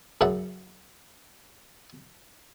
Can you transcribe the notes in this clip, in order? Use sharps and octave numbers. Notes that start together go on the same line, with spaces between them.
F#2 C#3 E5 F#5 A5